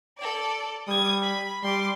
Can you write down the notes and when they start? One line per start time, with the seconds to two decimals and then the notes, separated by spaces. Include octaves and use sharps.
0.18 A4 D5
0.88 G3 D#6 G#6
1.22 B5
1.63 G3 C6 D6